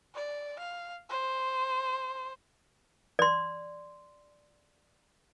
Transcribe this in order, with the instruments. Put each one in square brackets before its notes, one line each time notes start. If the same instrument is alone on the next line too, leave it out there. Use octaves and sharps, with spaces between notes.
[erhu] D5
F5
C5
[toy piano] D5 C6